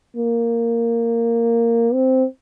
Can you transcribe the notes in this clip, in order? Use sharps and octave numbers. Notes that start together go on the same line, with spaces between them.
A#3
C4